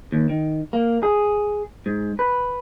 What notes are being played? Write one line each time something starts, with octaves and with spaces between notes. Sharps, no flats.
D#2
D#3
A#3
G#4
G#2
B4